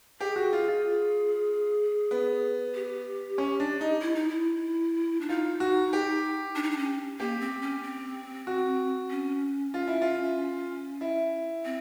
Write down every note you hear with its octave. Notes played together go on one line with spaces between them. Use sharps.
G4 G#4
F#4
F4
F4
B3
G4
C#4
D4
D#4
E4
D#4
E4
D4
D#4 F4
F#4
G4
D4
D#4
D4
C#4
A#3 G4
C4
C#4
C4
F#4
C#4
F4
E4
F4
E4
C4